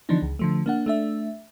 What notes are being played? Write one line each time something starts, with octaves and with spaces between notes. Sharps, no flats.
D3 E3 F3 B3 D4 D#4
C#2
D3 F3 A3
A#3 D4 F#5
A3 D4 E5